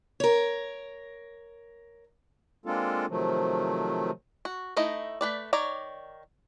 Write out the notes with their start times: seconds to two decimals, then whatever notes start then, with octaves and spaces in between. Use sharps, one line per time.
0.20 A#4 C#5
2.66 G#3 A#3 C4 D4 F4 A4
3.09 C3 D#3 F3 F#3 A3
4.45 F#4
4.77 A3 D#4 E4 D#5
5.21 A3 B4 D5
5.53 D#3 C#5 D5 A#5